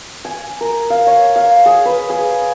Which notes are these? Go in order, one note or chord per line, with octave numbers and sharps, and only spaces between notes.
G#5
A#4
F5
C#5
F5
G#4
B4
G#4